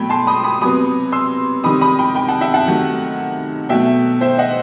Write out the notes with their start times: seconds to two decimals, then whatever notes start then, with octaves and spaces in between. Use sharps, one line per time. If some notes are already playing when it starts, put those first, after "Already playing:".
Already playing: B2 F#3 A3 G5 B5
0.09 A5 C6
0.27 B5 D#6
0.44 B5 D#6
0.61 C3 F#3 B3 B5 D#6
1.12 C6 E6
1.64 C3 D#3 G3 B5 D#6
1.81 B5 D#6
1.99 G5 B5
2.15 G5 B5
2.28 F#5 A5
2.41 E5 G5
2.54 F#5 A5
2.67 C3 D#3 F#3 A3
3.69 B2 F#3 A3 E5 G5
4.21 C5 E5
4.38 D#5 F#5